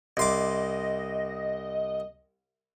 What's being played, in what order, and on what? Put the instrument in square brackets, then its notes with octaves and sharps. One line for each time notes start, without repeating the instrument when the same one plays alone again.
[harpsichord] C2 C6 D6 [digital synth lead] D#5